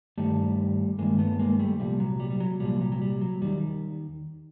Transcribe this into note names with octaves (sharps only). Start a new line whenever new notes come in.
G2 D#3 G3 A3
G2 D#3 G#3 A#3
A3 B3
G#3 A#3
G3 A3
C2 A#2 F3 G3
F#3
G3
G3
F#3
C2 A#2 F3 G3
F#3
F#3
G3
F#3
D#2 D#3 G3